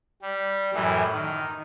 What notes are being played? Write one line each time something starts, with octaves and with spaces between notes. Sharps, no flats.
G3
F#2 A2 E3
D#3